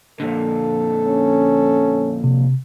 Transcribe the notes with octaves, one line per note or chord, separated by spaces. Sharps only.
F2 A#2 D3 A4
C#4
C3